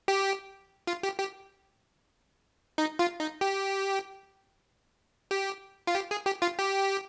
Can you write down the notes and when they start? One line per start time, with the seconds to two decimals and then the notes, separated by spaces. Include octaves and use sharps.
0.08 G4
0.87 F4
1.03 G4
1.19 G4
2.78 D#4
2.99 F4
3.20 D#4
3.41 G4
5.31 G4
5.87 F4
5.95 G4
6.11 G#4
6.26 G4
6.42 F4
6.59 G4